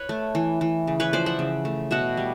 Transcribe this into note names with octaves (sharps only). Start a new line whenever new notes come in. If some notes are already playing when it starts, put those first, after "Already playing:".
Already playing: B4 C#5
A3
E3
E3
C#3
B4 C#5
F3 C5 D5
E5 F#5
C#3
A3
B2 E5 F#5
G3